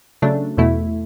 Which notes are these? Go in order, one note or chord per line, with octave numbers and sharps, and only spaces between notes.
C#3 F#3 A3 D4
E2 B2 A3 E4